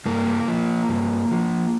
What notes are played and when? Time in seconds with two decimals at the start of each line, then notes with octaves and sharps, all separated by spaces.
0.06 G2 A#3
0.48 F3
0.89 G2
1.32 F3